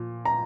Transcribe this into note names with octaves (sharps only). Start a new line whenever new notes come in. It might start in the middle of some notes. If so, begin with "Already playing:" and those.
Already playing: A#2 F3
A#5